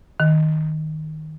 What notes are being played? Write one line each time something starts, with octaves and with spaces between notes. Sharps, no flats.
D#3